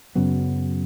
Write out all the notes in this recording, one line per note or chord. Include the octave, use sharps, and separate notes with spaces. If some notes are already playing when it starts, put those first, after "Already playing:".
F#2 C#3 F#3 B3